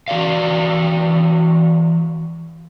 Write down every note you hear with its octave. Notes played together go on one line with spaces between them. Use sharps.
E3 F#4 D5 F5